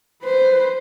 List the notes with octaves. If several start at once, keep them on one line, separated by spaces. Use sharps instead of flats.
B4 C5